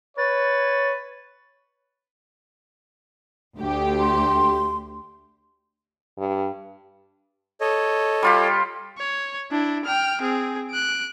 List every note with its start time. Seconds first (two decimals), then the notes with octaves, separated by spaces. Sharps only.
0.18 B4 C#5 A6
3.58 D2 G4
4.00 C6
6.18 G2
7.61 A4 C#5 D#5
8.23 G3 F4 G4
8.98 C#5
9.51 D4 E4
9.85 G5 F6
10.21 C4 G#4
10.71 F#6 D7